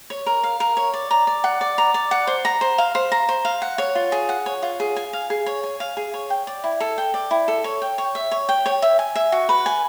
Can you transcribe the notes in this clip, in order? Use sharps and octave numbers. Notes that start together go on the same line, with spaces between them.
C#5
A#4
F5
A#4
C#5
D5
A#5
D5
F#5
D5
A#5
D5
F#5
C5
A#5
C5
F5
C5
A#5
C5
F5
F#5
C#5
F4
G#4
F#5
C#5
F4
G#4
G#5
F5
G#4
C#5
G#5
F5
G#4
C#5
G5
D5
E4
A4
G5
D5
E4
A4
C#5
G5
C#5
E5
C#5
G5
C#5
E5
G#5
E5
F#4
B4
G#5